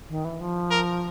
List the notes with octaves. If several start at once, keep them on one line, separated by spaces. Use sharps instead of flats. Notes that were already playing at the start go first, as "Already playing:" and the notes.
D#3
E3
F3
A#4